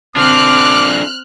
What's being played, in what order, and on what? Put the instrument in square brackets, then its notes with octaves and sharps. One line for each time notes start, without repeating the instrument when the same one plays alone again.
[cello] C4 [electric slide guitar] D4 F4 A4 [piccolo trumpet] D6 [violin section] F6 F#6